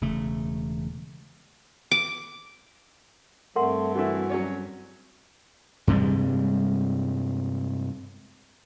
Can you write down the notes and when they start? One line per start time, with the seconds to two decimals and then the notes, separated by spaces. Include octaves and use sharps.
0.01 E1 C#3 A3
1.91 D6
3.56 G2 A3 C4 A#4 F#5 C6
3.95 E3 A3 E4 F#4
4.29 F#3 C#4 C#5
5.87 G2 C3 G3 G#3